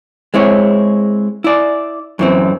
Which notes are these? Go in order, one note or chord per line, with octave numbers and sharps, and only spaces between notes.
G#3 C4 E4 C#5
E4 D5
F#2 E3 C4